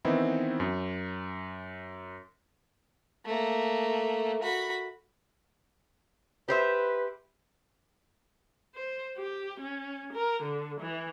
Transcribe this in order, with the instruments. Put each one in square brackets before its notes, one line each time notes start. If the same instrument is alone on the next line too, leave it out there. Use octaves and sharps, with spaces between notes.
[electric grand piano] D#3 E3 B3 C4 D#4 E4
F#2
[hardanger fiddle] A3 A#3
F#4 B5
[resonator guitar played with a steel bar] G4 C5 E5 [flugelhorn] B4
[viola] C5
G4
C#4
A#4
D3
E3